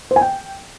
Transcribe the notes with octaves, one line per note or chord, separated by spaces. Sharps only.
C5
G#5
G5